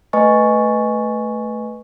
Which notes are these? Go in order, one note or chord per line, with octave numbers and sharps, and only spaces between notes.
A3 B4 D#5 G#5 C#6 A6